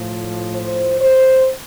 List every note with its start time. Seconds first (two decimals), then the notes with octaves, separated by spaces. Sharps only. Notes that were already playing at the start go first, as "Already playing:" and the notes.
Already playing: A2 F3
0.54 C5
1.00 C5